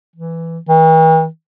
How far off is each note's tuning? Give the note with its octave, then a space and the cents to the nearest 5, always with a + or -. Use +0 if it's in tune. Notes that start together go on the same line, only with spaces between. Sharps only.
E3 +5
E3 -45